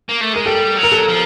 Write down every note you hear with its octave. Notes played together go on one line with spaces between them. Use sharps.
A#3
A3
G#3 A#4
G3 A4
F#3
A#4
A4
F3